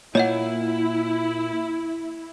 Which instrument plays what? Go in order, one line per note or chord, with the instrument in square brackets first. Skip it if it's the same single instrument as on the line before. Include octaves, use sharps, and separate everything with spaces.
[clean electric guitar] A#2 [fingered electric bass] A#3 [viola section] E4 [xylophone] C#5 D#5 F#5